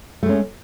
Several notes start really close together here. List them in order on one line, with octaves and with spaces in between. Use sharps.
A3 G#3 C#4